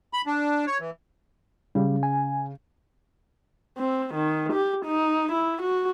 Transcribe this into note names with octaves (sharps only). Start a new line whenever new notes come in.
B5
D4
C#5
E3
C#3 G3
G#5
C4
D#3
G4
D#4
E4
F#4